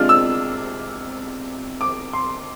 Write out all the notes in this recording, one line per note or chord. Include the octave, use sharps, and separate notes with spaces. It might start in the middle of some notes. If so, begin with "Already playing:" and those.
Already playing: C3 G#3 D4 F4 F6
E6
D6
C6